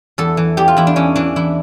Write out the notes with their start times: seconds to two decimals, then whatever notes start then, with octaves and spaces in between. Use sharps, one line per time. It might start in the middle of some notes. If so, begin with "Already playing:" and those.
0.18 E2 A4
0.37 E3
0.57 E2 G4
0.68 F4
0.77 E2 E4
0.87 D4
0.96 E3 C#4
1.16 E3 D4
1.36 E3 E4